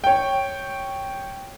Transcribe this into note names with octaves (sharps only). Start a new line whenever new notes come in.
C#5 G5